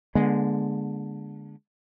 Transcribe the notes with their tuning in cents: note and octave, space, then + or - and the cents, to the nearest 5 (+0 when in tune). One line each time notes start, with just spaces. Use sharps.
D3 +0 G#3 +0 B3 -45